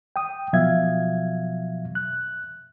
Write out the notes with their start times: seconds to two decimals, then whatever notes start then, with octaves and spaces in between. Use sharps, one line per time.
0.16 G5 D#6
0.53 B2 F3 F#3 E5 F5 G#6
1.95 F#6